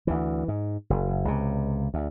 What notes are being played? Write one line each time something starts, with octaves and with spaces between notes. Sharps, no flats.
D2 E3
G#2
F#1
C#2 C3
D2